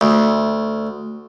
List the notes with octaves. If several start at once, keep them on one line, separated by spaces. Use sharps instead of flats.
D2